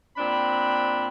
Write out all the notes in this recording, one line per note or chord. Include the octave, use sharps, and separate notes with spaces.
A#2 C4 D4 D5 B5